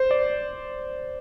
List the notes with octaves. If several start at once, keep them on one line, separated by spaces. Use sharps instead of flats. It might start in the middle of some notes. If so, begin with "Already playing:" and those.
Already playing: C5
D5